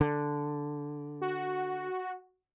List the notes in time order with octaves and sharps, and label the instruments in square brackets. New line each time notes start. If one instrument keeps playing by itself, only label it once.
[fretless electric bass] D3
[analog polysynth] F#4